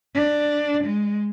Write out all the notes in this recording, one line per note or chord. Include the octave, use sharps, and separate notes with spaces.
D4
G#3